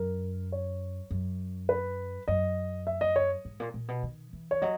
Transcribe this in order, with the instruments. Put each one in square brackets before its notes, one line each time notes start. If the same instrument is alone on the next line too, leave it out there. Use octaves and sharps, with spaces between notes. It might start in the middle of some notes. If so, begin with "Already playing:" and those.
Already playing: [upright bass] F#2 [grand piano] A#4
[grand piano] C#5
[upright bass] F#2
[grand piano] B4
[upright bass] F#2 [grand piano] D#5
[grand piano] E5
D#5
C#5
[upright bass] G#2
A#2
A#2
B2
D#3
E3
[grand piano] C#5
[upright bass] F#3 [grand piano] D#5